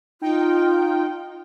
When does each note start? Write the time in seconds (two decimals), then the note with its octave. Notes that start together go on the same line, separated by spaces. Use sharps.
0.22 D#4 F4 G5